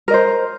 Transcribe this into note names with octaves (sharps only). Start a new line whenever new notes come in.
A#4 C5 D#5